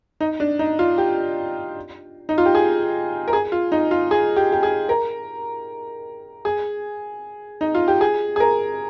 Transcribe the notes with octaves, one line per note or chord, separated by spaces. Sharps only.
D#4
D4
D#4
F4
G4
D#4
F4
G4
G#4
A#4
G#4
F4
D#4
F4
G#4
G4
G4
G#4
A#4
G#4
D#4
F4
G4
G#4
G#4
A#4